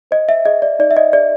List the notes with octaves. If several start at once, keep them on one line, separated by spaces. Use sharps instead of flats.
C5 D#5
E5
G#4 D#5
D5
D#4 D5
E5
D#5
G#4 D5